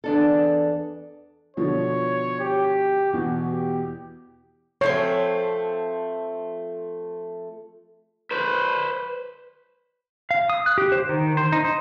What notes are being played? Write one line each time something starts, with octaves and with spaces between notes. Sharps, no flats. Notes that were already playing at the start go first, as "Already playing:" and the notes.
E2 D4 A4
B2 D3 F3 C#5
G4
E2 B2 F#4
G4
F3 A3 C4 C#5
B4 C5
F5
D#6
F#6
G4
C5
D#3
C5
D#4
C5